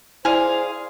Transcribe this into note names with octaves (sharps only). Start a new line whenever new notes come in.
E4 G#4 C5 D5 F5